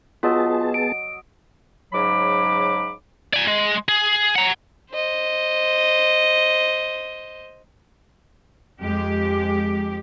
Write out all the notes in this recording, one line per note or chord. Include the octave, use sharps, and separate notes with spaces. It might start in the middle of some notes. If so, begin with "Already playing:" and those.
F#3 B3 F4 G#4 D#5 A5 E6
D7
G#2 C#3 F#3 B5 D6
D5 G#5
G#3
G#4
F#5 A#5
C5 D#5
F2 G#3 G4